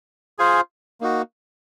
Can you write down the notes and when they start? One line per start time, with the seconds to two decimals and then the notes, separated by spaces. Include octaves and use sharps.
0.39 F4 G#4 C5 F5 G#5
1.01 A#3 D#4 F#4